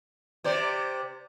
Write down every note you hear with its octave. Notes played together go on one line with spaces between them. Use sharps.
C3 C5 D5